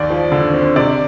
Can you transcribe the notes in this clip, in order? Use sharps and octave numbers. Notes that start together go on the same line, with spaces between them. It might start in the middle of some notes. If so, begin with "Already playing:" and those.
Already playing: D#2 D5
F3
D3
C4
C3 D5